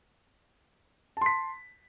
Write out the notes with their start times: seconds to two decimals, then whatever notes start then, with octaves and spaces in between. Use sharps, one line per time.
1.17 A5
1.21 C6
1.26 B6